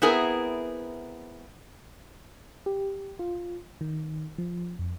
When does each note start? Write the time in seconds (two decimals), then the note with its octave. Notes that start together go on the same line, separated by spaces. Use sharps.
0.02 B3 C4 E4 G#4 A#4
2.66 G4
3.19 F4
3.81 D#3
4.38 F3
4.79 F2